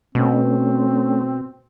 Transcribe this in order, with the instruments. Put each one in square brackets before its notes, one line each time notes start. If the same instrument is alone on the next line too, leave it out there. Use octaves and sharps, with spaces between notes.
[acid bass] B2 [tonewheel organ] A3 C#4 [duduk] C4